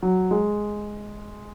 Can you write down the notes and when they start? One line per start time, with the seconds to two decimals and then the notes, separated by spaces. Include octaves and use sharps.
0.02 F#3
0.31 G#3